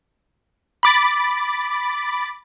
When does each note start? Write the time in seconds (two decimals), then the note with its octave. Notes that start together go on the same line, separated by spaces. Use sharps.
0.83 B5 D6 A6